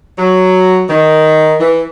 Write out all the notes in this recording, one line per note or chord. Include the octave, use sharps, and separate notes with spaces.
F#3
D#3
E3